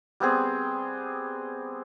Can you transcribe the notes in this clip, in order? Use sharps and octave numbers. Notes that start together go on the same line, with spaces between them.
G3 B3 C4 G#4